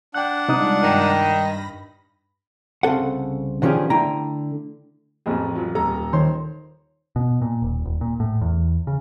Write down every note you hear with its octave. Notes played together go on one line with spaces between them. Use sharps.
D4 F#5 G5 F#6
C3 G3 G#3 D#4 F4 D#6
G2 D#3 B5 A#6
C2 C#3 C4 A4 F#5
D3 D#3 F3 C#4 G4 G#4
D3 A3 E4 G5 A#5
A1 F2 C4 G#4
F3 F#3
D#1 A4 A#5
D#3 C5 C#5 C6
B2
A#2
D#1
D#1
A#2
A2
E2
C#3